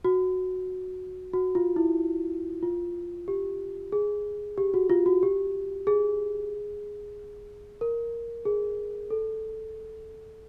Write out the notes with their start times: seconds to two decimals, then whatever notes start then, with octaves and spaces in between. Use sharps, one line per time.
0.05 F#4
1.33 F#4
1.55 F4
1.76 E4
2.63 F4
3.28 G4
3.92 G#4
4.58 G4
4.74 F#4
4.90 F4
5.06 F#4
5.23 G4
5.87 G#4
7.81 A#4
8.45 G#4
9.10 A4